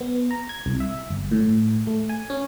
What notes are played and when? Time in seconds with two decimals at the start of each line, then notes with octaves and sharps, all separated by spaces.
0.01 B3
0.31 A#5
0.49 G#6
0.66 C2
0.80 E5
1.10 G1
1.31 A2
1.87 A3
2.09 G#5
2.30 C#4